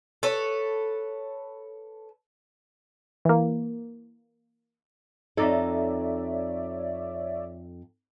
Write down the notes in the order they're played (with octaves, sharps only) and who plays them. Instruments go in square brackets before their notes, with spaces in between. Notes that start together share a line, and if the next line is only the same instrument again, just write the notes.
[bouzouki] A4 B4 C#5
[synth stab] E3 A#3
[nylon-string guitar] F2 D#4 A4 [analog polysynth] C#5 D5 E5